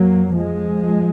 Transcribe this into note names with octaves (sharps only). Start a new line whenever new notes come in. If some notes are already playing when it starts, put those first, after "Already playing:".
Already playing: F2 F#3 A#3
F3 G#3